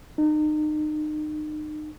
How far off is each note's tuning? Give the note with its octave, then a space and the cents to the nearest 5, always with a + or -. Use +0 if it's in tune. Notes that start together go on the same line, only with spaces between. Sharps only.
D#4 -35